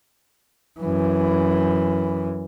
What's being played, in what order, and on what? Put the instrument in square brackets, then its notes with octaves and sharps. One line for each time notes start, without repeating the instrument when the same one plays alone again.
[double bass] F#2 E3